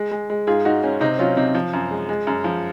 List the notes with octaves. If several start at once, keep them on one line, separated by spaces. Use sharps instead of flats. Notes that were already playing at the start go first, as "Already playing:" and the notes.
Already playing: G#3
G#3
G#3
G#2 F4 G#4
G#2 D#4 F#4
G#2 C#4
C3 C4 D#4
F#3 C#4 F4
C3 C4 D#4
F3
F#2
G#3
G#3
F#2
F3